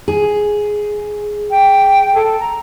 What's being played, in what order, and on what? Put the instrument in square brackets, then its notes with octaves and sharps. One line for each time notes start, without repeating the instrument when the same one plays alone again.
[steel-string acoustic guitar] G#4
[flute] G5
A4
A#5